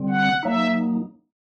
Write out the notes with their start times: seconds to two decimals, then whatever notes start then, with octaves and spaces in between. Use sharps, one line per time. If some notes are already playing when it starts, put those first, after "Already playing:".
Already playing: D3 G3 C4
0.10 F#5
0.43 F#3 A#3 D#4 E5